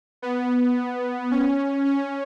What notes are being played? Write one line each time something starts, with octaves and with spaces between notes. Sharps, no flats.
B3
C#4
C#4